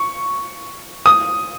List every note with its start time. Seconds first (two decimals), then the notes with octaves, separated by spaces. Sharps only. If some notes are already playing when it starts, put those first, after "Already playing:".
Already playing: C#6
1.06 D#6